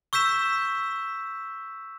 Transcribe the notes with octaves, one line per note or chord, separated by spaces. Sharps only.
C#6 E6 G6 B6 E7